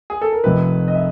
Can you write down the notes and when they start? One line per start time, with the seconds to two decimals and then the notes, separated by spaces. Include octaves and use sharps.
0.10 G#4
0.22 A4
0.33 A#4
0.44 F1 F2 C3 F3 B4
0.88 D#5
0.95 E5